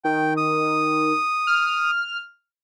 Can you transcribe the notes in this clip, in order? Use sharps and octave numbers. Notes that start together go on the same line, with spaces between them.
D#3 G5
D#6
F6